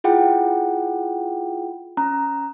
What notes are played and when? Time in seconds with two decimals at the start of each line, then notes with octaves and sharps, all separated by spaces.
0.04 E4 F4 G#4 F#5 G5
1.97 C#4 A#5